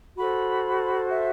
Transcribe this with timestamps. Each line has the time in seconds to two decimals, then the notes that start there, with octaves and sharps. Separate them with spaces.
0.17 F#4 A4 C5 B5
1.10 E5